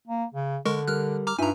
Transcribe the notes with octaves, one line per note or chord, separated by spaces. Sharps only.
A#3
C#3
D3 G#3 A#4 C#6
G3 A#4 F6 F#6
A#5 D6 F6
G2 D#4 F4 E5 G#5 A#5